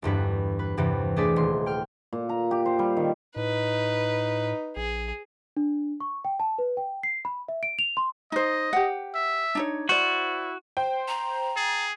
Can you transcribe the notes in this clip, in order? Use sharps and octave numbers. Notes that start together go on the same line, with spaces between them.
G1 E2 G2 B4
B4
E2 G2 C3 E3
A3 D4 G#4 C5 D5 B6
D#1 C6
G5 F6
A#2
A#5
G4
C5
G3
D#3
A2 D#4 B4
A#1 G#4
D4
C#6
G5
A5
B4
G5
C7
B5
E5
D7
F7
C6
D#4 C5 D#5
G4 F#5
E5
D4 D#4 C#5
E4 F#4 C5 D5
C5 G5
A#5
G#4 A6